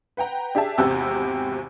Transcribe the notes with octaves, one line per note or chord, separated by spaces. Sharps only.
B4 F#5 G5 A#5
D4 G4 G#4 E5 A5
G#1 E2 C3 G4 E6